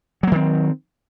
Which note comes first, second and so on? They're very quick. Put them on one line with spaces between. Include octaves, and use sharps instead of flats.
F#3 A#3 D#3 C4